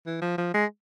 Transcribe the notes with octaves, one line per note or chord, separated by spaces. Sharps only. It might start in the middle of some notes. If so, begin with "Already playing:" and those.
E3
F3
F3
G#3